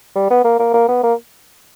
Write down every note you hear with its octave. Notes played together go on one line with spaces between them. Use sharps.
G3
B3
A#3
A#3
A#3
B3
A#3